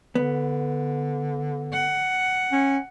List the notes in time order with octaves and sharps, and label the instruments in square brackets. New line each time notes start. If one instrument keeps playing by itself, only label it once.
[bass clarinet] D3 [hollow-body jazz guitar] B3
[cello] F#5
[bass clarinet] C#4